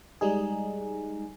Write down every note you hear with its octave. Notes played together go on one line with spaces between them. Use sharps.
G3 G#3 D#4 G#4